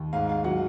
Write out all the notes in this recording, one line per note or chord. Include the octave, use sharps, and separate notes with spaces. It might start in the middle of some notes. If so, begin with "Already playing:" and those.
Already playing: D#2
G#2 F5
F5
F#3 F#5